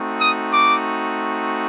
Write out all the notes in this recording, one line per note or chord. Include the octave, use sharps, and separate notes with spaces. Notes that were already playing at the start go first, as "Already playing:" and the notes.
Already playing: A3 C4 D#4 F#4
D#6
D6